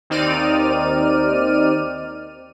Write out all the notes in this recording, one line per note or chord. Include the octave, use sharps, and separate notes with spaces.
D#2 C4 D#4 D5 F6 D#7